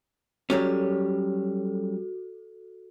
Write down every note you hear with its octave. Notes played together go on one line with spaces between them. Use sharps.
F#3 G3 C#4 F#4 A4